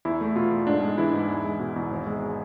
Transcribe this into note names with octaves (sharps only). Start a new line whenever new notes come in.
E2 E4
A3
B2 F4
E2
G#2 D4
G#3
E3 E4
G#2
E2
G#3
B2
E2
G#1
G#3